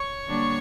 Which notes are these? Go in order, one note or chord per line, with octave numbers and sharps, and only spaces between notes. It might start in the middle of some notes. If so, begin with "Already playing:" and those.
Already playing: C#5 C#6
D3 G3 A#3 D4